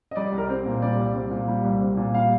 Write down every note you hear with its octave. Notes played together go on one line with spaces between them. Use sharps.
D#5
G3 D5
C2
A#4
C4
A#2
G3 D5
C2
C4
A#2
G3
C2
C4
A#2
G3 F5